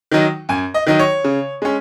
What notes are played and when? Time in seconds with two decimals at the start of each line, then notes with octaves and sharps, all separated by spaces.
0.11 D#3 F#3 D#4
0.49 F#2 G#5
0.74 D#5
0.86 D#3 F#3 D#4
0.99 C#5
1.24 C#3
1.62 G#3 C#4